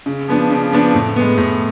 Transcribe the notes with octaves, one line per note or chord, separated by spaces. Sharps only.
C#3
F3 B3 D4
C#3
F3 B3 D4
A2
G#3 B3
A2